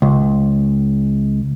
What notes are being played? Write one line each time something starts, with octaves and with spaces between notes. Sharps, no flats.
C#2